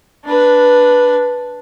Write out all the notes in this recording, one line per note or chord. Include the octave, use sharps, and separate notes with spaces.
D4 B4